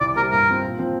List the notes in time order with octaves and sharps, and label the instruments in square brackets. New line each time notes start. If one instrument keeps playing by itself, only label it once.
[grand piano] C2 [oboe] D5
[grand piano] C3 G3 [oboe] A#4
[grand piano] G2 [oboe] A#4
[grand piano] F3 C4
A#2
F3 C4